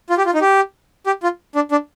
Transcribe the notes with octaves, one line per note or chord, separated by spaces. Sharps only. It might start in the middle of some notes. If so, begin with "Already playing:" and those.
F4
G4
F4
D#4
G4
G4
F4
D4
D4